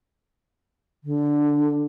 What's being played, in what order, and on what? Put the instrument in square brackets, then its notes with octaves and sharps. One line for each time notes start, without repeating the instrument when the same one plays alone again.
[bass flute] D3